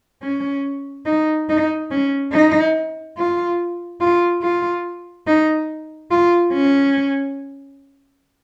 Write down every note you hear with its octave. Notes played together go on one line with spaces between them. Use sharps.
C#4
D#4
D#4
C#4
D#4
F4
F4
F4
D#4
F4
C#4